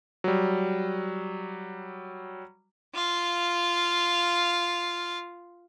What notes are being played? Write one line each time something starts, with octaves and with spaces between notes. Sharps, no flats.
F#3 G3
F4 F5